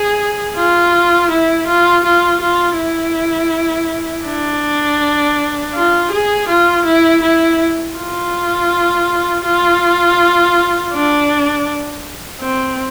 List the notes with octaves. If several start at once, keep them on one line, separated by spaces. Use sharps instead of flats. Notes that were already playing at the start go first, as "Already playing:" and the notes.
Already playing: G#4
F4
E4
F4
F4
F4
E4
D4
F4
G#4
F4
E4
E4
F4
F4
D4
C4